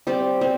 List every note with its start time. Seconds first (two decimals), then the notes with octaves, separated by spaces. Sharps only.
0.07 G3 C4 G4 D5
0.41 G3 C4